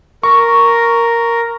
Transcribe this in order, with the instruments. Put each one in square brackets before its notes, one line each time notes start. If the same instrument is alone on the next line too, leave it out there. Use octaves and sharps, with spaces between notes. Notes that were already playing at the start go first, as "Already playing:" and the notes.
[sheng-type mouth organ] A#4 [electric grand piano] C#6